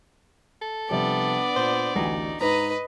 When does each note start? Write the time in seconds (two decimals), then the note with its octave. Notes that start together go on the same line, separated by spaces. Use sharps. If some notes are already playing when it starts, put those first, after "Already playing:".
0.61 A4
0.90 C3 F3 G3 B3 D4 D5
1.56 A#2 C5
1.96 A1 D2 D#4 G#5
2.41 G#2 B4 D#5 A#5